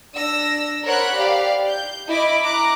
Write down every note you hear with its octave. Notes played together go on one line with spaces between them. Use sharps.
D4 E6 A#6
A#4 C5 C#5 F#5 B5 F#6
G4 D5 F5
G6
E4 D#5 B5 D6
A#5 D6 F#6